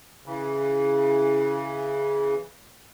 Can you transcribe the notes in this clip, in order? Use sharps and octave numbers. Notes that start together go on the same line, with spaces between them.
C#3 E3